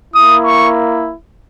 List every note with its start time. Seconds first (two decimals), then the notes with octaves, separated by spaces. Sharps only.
0.14 A#3 E4 D#6
0.46 C#6